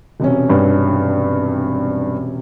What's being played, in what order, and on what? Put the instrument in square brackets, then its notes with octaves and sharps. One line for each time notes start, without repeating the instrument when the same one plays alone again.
[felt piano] E1 C3 C#4
[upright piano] G2